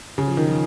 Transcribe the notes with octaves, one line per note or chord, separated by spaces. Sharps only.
C#3
F3
D#3
F3